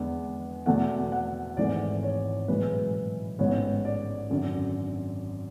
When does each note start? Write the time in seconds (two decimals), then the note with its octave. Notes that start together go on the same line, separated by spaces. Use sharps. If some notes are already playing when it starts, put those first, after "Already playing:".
Already playing: E2 D3 G#3 B3
0.66 E2 B2 A3 F#5
1.12 F#5
1.57 G#1 G#2 E3 A3 D5
2.03 C#5
2.48 B1 A2 E3 G#3 B4
3.39 A1 G#2 G#3 B3 C#5
3.85 D5
4.30 G#1 F#2 D3